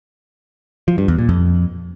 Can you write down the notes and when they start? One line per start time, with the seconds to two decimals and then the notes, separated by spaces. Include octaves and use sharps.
0.88 F3
0.98 G2
1.08 E2
1.19 A#2
1.29 F2